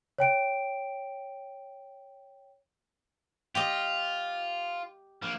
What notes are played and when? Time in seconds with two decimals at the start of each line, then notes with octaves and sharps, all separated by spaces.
0.18 C#5 G5 D7
3.55 F4 G4 D#5
5.22 F3 A#3